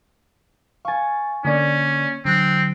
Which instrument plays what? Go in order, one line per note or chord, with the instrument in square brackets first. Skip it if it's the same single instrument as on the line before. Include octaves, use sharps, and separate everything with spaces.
[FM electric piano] F5 A6 [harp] G#5 C#6
[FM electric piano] D3 A#3 D5 [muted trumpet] C#4
[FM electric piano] D3 F#3 F#6 [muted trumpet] C4